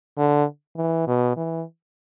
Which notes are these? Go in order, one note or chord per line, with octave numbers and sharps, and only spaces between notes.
D3
E3
B2
E3